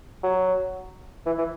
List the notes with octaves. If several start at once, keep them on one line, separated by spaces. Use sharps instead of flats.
F#3
E3
E3